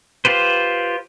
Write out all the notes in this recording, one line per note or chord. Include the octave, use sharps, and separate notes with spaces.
F4 G4 B4 C5